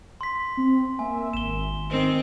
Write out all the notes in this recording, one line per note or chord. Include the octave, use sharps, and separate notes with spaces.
C6 B6
C4
A#3 E5 G#5
G#1 E7 G7
D#3 C4